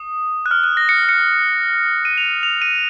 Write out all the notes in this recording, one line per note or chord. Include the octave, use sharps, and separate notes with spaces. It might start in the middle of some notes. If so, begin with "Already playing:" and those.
Already playing: D#6
F#6
F6
F#6
A#6
C#7
C#7
D#7
F7
F7
D#7